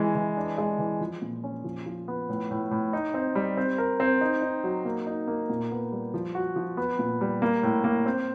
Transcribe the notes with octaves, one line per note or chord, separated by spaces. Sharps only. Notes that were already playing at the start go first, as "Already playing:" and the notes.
Already playing: E3 G#3
E3
D4
G#3
E3
F3
A#2
C#4
F3
F3
B3
A2
A2
A2
D#4
C4
G3
C4
A#4
C4
D#4
D#4
F#3
A#3
D#4
A#3
A#2
B3
G3
F3
F#4
F3
B3
A#2
G3
A#3
A2
A#3
C4